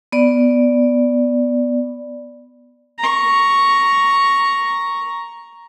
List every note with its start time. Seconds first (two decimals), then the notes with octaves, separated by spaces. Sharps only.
0.12 B3 D5
2.99 A#5 C#6